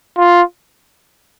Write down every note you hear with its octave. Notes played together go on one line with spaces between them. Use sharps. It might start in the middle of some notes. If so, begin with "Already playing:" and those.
F4